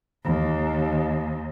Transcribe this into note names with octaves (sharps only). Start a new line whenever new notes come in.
D#2